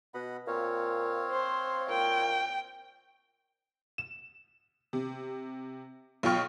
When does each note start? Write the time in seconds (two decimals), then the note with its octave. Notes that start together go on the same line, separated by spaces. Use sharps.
0.14 B2 D#5 F#5 B5
0.47 A#2 C4 C#5 F5
1.31 C5
1.89 A#2 G5
3.98 E7
4.93 C3
6.23 B1 F4 G5 C#6 F6